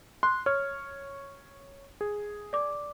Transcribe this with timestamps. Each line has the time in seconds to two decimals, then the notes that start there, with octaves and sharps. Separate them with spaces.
0.23 C6 F#6
0.46 C#5 F6
2.01 G#4
2.53 D5 D6